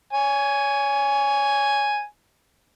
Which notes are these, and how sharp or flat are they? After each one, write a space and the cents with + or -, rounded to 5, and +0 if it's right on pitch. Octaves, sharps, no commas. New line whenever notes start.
C#5 +30 G#5 +0